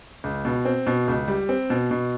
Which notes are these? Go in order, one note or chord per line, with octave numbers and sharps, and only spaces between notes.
C#2
B2
C4
B2
C#2
G3
C4
B2
B2